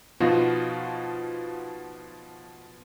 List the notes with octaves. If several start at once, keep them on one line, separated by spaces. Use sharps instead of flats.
B2 F3 D#4 F4 F#4